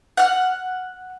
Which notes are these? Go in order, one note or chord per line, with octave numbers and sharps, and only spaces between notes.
F#5 F6